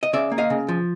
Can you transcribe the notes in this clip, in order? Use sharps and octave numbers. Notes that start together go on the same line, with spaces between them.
D#5
C#3 D5 E5
A#3
D#5 F5
C#3
F3